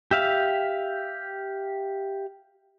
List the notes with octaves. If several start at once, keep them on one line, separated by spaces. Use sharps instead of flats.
G4 E5 F5